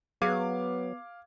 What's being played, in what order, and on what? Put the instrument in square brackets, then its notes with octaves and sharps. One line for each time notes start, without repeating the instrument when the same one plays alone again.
[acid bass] F#3 [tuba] B3 [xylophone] G#4 [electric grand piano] F5 D6 G#6